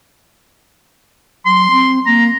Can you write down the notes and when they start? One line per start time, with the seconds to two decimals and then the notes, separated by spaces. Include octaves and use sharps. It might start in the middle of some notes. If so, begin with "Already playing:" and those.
1.46 F#3 C6
1.71 C4
2.06 A#3 A#5